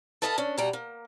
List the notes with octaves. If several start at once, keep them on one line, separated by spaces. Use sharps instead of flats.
A4 B4 D#5 F5 F#5 A5
C#4 D4
B2 G3 A#5
A#3